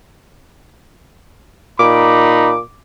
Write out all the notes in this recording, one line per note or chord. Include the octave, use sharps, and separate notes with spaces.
A#2 D#4 B5 D6